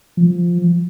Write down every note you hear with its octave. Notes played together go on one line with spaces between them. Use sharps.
F3